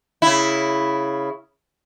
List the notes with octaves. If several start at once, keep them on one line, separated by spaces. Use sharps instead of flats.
C#3 E4